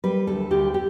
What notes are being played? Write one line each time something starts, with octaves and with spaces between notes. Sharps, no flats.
G3 B4
D2 A4
D2 G4
G4